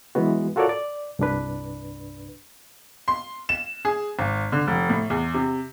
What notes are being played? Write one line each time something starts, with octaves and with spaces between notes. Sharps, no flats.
E3 F#3 G#3 B3 F#4
F4 F#4 A4 A#4 C#5 D5
D5
C2 G2 D4 B4
C6
E7
G#4
G#1
D3
F1
A2
E2
C3